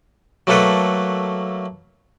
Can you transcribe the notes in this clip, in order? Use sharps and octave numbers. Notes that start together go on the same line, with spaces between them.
F#3 A3 A#3 A4 B4 F#5